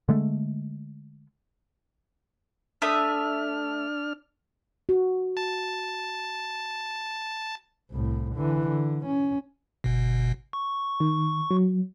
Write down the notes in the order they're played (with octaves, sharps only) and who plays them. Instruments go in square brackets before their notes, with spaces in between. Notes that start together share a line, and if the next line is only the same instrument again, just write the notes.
[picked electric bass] D3 G#3 A3
[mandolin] A3 E5 D#6 [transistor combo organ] D4 F6
[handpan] F#4
[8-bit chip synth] A5
[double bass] C2 A2
D3 E3
D3
C#4
[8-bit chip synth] G1 B2
C#6
[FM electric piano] D#3
F#3